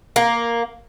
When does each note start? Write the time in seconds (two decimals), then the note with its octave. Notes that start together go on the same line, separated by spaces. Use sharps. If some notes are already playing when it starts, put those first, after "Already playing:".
0.16 A#3